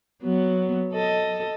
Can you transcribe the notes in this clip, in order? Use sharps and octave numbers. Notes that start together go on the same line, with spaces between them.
F#3 B3
A4 D#5